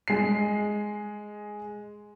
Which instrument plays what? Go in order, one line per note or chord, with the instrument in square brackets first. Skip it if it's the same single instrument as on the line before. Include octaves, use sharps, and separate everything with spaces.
[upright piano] G#3 C7